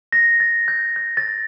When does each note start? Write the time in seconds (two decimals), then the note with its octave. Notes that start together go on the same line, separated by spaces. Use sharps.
0.12 A#6
0.40 A6
0.68 G6
0.96 G6
1.17 A6